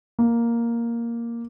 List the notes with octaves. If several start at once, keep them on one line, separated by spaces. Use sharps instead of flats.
A#3